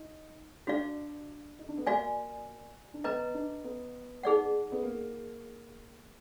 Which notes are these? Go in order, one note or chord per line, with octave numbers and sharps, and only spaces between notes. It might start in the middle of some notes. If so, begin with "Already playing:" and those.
Already playing: D#4
D4 F#4 D5 F5
D#4
D4
B3
A#3 F#4 D5 F5 G#5
D4
B3 B4 D#5 A#5
D4
B3
D#4 G#4 D5 F#5
B3
A#3